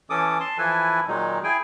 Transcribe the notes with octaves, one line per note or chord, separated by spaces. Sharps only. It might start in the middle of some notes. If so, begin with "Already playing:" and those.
E3 C#4 A4 D6 D#6
A5 C6
E3 F3 E4 A4 B4 G#5
A#2 D#3 F#3 G#3 D#4
E4 G#4 G5 G#5